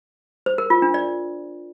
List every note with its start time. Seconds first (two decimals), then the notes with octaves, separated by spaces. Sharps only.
0.46 C5
0.58 A#4
0.70 F4
0.82 D4
0.94 D5